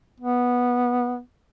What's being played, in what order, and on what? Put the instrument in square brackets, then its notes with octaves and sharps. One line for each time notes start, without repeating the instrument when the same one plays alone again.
[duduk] B3